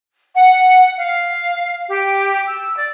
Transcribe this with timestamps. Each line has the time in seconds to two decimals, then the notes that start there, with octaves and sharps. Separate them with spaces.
0.34 F#5
0.97 F5
1.88 G4
2.47 E6
2.77 D5